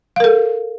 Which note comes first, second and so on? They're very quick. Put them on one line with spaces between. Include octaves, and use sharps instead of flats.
F5 A#4 A4